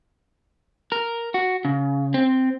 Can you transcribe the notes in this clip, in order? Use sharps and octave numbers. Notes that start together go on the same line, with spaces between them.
A#4
F#4
C#3
C4